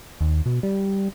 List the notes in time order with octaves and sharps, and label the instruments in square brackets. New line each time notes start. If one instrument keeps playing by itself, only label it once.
[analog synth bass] D#2
B2
G3